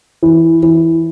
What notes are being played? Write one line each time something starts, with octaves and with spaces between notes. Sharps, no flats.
E3
E3